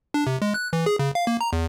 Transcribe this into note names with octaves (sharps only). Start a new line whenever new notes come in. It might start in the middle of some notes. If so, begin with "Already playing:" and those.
D4
C3
G#3
F#6
E3
G#4
C#3
F5
A#3
A#5
E2